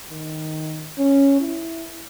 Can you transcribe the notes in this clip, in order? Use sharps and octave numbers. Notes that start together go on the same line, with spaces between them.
D#3
C#4
E4